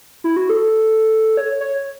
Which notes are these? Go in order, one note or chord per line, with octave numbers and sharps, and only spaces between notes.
E4
F#4
A4
C#5
C#5